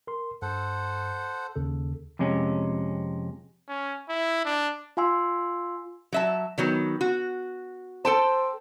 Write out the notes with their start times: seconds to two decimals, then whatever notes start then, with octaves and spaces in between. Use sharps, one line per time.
0.07 A#4 C6
0.42 G2 A4 C5 F#5
1.56 D#2 C#3 A4
2.19 F2 C3 G#3 C#4
3.69 C#4
4.09 E4
4.45 D4
4.97 F4 F5 G#5 C6 E6
6.12 F#3 E5 A5
6.58 D#3 F#3 B3
7.01 F#4
8.05 A4 C5 G5 A5